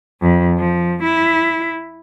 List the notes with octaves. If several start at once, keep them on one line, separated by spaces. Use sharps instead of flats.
F2
F3
E4